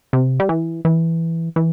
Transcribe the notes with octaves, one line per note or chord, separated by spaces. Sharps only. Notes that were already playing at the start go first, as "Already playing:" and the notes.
C3
G3
E3
E3
E3